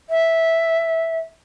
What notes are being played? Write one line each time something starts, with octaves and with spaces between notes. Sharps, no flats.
E5